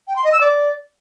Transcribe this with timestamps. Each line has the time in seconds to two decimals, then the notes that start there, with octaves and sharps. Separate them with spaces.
0.08 G5
0.16 C6
0.24 D#5
0.32 E6
0.41 D5